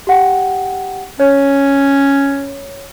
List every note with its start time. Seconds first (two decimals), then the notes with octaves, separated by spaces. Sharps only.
0.07 G4 F#5 G5
1.20 C#4 C#5